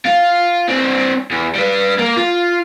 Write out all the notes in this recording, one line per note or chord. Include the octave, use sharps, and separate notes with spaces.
F4
C4 D4
E2
G3 B4
A#3
F4